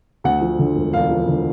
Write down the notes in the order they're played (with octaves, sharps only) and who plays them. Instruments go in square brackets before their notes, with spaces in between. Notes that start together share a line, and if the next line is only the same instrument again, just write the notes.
[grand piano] D2 F#5
F3
D3
E1
E1 F5
F3
D3